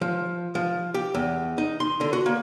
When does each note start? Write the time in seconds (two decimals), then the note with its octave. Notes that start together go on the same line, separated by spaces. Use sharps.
0.01 F3
0.55 F3
0.94 G4
1.14 E2
1.58 D#4
1.80 C6
2.01 D3
2.13 F#4
2.26 A#3